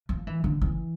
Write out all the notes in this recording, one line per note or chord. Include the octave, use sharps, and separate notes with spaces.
F3
E3
D3
E3